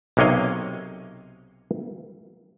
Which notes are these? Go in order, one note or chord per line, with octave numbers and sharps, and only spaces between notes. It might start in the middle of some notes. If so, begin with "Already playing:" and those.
B1 C3 A#3 C#5 D#5 F5